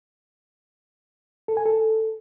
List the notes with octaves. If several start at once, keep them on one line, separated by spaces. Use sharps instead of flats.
A4
G#5
A4